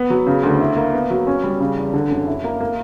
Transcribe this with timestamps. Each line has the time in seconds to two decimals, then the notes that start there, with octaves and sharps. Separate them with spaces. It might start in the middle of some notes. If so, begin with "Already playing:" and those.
Already playing: B3
0.10 F#3
0.27 C#3
0.43 D2
0.60 E4
0.77 A#3
0.93 B3
1.10 F#3
1.27 C#4
1.44 G3
1.60 C#3
1.77 E2
1.94 D3
2.11 F#2
2.27 E4
2.44 A#3
2.61 A#3